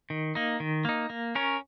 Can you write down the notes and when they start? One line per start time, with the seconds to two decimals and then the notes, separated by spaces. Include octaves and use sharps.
0.10 D#3
0.35 A#3 D#4
0.60 D#3
0.85 A#3 D#4
1.10 A#3
1.35 C#4 A#4 C#5